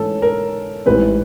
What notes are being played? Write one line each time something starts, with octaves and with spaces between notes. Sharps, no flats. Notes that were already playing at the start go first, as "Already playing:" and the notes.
Already playing: G#2 E3 A3 C#4 A4
A#4
A1 G#2 E3 G3 C4 B4